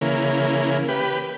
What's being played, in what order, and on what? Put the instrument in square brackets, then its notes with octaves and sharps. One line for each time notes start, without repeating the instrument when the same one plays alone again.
[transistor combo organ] C#3 E3 A#3
G4 B4